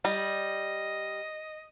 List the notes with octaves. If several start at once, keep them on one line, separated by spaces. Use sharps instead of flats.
G3 D#5